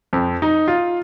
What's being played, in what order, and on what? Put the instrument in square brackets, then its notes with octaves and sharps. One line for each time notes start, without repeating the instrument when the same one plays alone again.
[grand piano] F2
D#4
F4